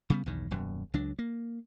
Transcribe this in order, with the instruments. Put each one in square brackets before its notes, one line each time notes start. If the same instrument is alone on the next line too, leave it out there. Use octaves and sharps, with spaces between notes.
[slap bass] C#3 G3 B3
B1 E2 G2 D#3
D#1 F#2 B2
C#2 F#3 D4
A#3